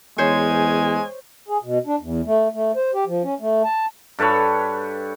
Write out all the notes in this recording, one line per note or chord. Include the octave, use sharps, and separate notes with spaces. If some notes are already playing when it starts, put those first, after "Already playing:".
E2 G#3 C5 C#5 G#5
G#4
B2
D4
E2
A3
A3
C5
G4
F3
C#4
A3
A5
G2 A4 B4 C#5